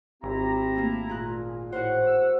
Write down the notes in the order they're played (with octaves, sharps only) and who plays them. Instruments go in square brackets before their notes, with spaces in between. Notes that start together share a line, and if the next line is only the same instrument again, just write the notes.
[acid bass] G#1 [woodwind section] C4 G4 [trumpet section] E4 A#5
[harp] A3 A#3
[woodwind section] A#2 F4 [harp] G#4 F#6
[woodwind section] A2 [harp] F#4 A#4 C5 [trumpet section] F#5
[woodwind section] E6